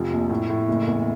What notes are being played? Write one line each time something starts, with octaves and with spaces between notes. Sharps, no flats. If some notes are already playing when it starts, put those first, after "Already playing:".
Already playing: F1 F3
A#1
A2
A2
F#1
E2